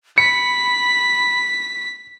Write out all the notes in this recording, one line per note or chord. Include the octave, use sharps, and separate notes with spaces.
B5 B6 C#7